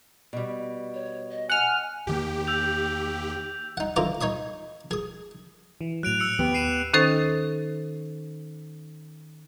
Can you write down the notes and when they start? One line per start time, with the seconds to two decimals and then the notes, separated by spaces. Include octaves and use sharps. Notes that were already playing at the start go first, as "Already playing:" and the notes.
0.33 B2 G3
0.94 C#5
1.30 D#5
1.50 F#5 G#5 F6
2.07 E2 D#3 A#3 G4
2.47 E6 G6 F7
3.77 D#4 F#5
3.96 D3 E3 F4 A#5 D6
4.21 D#4 C#5 B5 D#6
4.91 G#4 D#6
5.81 E3
6.03 A2 F#3 F#6 D7 F7
6.20 E6 C#7
6.39 D#2 B3 G4
6.54 C7 D#7 E7
6.93 D#3 C#4 D#4 A4 C5 A6